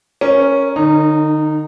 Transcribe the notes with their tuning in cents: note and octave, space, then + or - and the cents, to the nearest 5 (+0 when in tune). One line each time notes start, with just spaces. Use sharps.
C#4 +0 A#4 +0
D3 +40 D#4 -15 A#4 -45